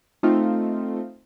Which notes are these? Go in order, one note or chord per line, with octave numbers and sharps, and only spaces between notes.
A3 C4 D#4 F4